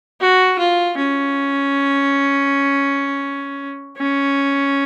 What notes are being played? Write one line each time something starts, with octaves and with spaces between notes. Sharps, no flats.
F#4
F4
C#4
C#4